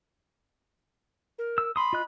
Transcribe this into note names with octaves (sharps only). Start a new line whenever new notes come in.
A#4
E6
B5 C6 D#6
F4 D#5 F#6